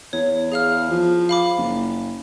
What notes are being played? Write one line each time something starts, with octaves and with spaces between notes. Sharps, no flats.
E2 C#5
G#4 F5 F6
F3
F5 B5 D6
F#1